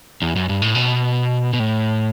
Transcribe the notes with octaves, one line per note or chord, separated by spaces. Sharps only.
E2
F#2
G2
A2
B2
B2
A2